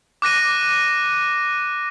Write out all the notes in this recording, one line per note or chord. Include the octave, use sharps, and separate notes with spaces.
D6 F#6 A#6 D#7